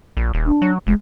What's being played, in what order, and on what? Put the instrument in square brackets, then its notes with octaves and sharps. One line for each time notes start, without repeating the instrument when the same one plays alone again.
[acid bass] A#1
D#1
[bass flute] D4
[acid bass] F#3
[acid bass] F1 [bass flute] G#3